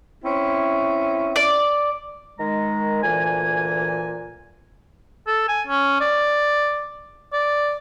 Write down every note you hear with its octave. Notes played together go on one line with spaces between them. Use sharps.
C4 C#4 E4
D5
D#3 G#3 A#5
D2 A#2 E3 G#5
A4
G#5
C#4
D5
D5